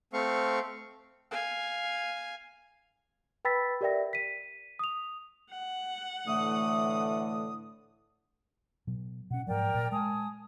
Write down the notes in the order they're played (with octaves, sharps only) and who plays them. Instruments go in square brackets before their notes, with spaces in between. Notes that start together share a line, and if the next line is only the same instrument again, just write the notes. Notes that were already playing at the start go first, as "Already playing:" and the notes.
[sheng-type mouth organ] A3 C4 F5 C#6
[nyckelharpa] F5 G#5
[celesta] B4 G5 B5 E6 A6 B6
G4 A#4 D5 E5 G5 A#6
B6 D#7
D#6 F7
[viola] F#5
[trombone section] A2 D3 E3 [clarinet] A3 [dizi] D#6
[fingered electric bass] B2 F#3
[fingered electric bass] B2 C#4 [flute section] F#5
[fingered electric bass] G#2 F3 F#3 [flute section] A#4 D5 G5
[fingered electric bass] A#2
[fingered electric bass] G#3 [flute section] G#5 A5 D#6